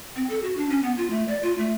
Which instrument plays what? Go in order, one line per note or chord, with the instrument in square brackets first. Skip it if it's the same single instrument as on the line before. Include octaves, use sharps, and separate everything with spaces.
[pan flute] C4
A4
F#4
D4
C#4
B3
F4
A3
D5
F4
A3